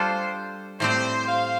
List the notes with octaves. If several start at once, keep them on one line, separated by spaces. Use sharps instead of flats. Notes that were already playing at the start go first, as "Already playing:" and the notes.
Already playing: G3 D4 F4 G4 A4 C5
A2 G3 C4 G4 C5
C5 F5